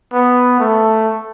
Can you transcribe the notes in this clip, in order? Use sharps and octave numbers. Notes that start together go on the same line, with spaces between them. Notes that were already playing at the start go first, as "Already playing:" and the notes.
B3
A3